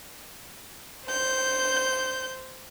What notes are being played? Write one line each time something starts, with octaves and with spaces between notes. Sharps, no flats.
C5 G6